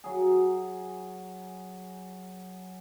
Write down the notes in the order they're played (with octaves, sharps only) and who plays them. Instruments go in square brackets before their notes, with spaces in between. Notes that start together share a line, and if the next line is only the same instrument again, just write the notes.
[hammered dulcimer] F#3 G#4